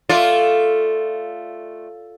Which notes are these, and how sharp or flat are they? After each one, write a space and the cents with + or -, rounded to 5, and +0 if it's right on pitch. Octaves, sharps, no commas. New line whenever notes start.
A3 +0 F4 +0 D5 -15